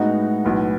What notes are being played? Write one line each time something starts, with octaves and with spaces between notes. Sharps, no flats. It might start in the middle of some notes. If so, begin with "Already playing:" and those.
Already playing: A2 G#3 B3 D#4 F#4
B1 A2 E3 B3